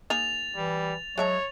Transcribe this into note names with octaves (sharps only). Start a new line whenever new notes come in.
A#3 D#4 G#4 A6 F7
E3 G3
F#3 G#3 C#5 E5 A5